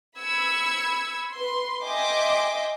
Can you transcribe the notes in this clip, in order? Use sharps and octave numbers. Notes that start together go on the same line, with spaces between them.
B5 E6 G#6 C#7
B4 C6
D#5 E5 G5 G#5 C6 D6